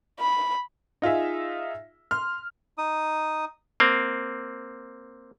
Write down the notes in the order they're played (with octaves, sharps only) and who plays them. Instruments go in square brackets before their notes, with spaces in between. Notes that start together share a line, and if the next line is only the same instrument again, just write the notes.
[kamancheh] B5
[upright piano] D#4 F4 G#4 E5
C6 F6
[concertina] D#4 D#6
[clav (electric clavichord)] A#3 C4